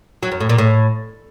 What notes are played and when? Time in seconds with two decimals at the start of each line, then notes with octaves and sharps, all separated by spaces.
0.23 F#3
0.32 F#2
0.40 A2
0.49 A#2
0.58 A2